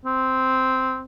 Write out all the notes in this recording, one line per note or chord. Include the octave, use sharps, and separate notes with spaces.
C4